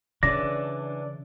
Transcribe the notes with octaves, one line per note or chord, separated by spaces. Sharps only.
C#3 E3 D4 D5 A#6